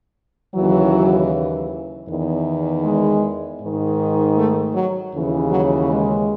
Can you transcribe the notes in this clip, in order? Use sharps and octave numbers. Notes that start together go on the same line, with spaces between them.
D#2 C#3 E3 F#3
E2 D#3
G#3
G#2 D#3
A3
F#3
D#2 C#3 E3
F#3
G#3